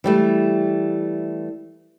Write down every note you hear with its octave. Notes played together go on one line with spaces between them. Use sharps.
E3 G3 A3